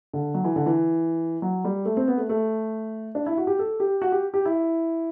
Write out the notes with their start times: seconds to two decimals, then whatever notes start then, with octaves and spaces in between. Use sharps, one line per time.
0.13 D3
0.34 F#3
0.44 E3
0.56 D3
0.66 E3
1.42 F#3
1.65 G3
1.85 A3
1.97 C4
2.08 B3
2.18 A3
2.29 A3
3.15 D4
3.26 E4
3.37 F#4
3.47 G4
3.59 A4
3.80 G4
4.02 F#4
4.12 G4
4.34 G4
4.45 E4